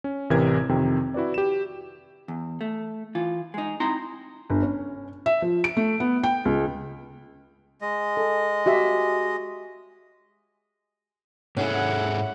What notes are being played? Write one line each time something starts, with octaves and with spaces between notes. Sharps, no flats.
C#4
A1 C3 E3 A#4 G#6
F2 C3 D#3 C4
E4 F#4 B4 D5
G4 E7
E2
A3
E3 F4
G#3 D#4
C4 D#4 E4 A#5 C6
G1
C#4
E5
F3
D7
A3
B3
G5
C#2
G#3 D#5
A4
F#4 G4 E5
G#2 C#4 E4 G#4 A4 F#5